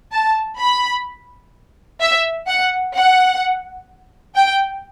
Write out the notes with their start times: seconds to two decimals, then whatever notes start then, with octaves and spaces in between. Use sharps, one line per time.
0.12 A5
0.59 B5
2.01 E5
2.48 F#5
2.95 F#5
4.36 G5